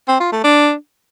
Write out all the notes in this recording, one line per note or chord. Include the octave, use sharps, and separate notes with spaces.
C4
F4
A3
D4